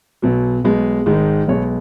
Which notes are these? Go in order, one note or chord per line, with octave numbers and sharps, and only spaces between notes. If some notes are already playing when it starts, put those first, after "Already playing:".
B1 B2 F#3
B1 B2 G#3
G#1 G#2 D#3 G#3
B1 B2 G#3 C#5